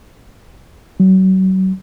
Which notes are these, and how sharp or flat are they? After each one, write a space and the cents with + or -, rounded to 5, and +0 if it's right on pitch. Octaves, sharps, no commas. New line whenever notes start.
F#3 +30